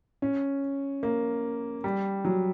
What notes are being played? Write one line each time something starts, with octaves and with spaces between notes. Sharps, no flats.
C#4
A#3
G3
F#3